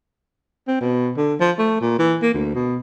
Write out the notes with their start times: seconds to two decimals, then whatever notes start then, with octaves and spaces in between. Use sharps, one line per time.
0.68 C4
0.80 B2
1.17 D3
1.40 F3
1.58 A3
1.81 A#2
1.99 E3
2.22 A#3
2.34 D2
2.55 B2